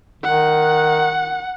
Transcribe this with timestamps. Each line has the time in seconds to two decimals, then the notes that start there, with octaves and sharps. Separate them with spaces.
0.24 D#3 F#5